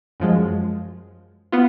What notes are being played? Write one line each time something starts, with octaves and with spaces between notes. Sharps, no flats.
F#2 F3 G#3
B3 F4